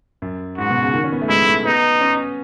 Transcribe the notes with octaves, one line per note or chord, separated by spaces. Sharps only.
F#2
G#2 F#4
B2
C#3
D#3
C#4
B3
A3
G#3 E4
A3
B3 D#4
C#4